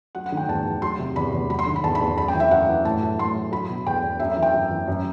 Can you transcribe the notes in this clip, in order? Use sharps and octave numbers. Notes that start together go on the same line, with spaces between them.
F#3 F#5
F#5
D#3 G5
E2 A5
E2
F#3 C6
C3
E2 B5
E2
F#3 B5
C6
D#3
B5
E2 A5
B5
E2
F#2 B5
G5
E3
E5
F#2 F#5
E3
A2 A5
F#3
A2 C6
F#3
F#3 B5
B2
E2 G5
E2
F#2 E5
E5
E3
G5
F#2
E3
F#2